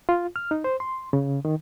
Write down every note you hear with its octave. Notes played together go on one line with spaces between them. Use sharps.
F4
F6
D#4
C5
C6
C#3
D#3